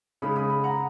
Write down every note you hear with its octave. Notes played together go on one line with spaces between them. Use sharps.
C#3 G#3 B5 D#6
B5 D#6
B5 D#6
F#5 A#5